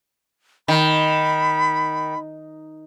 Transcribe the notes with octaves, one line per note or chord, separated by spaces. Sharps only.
D#3 B5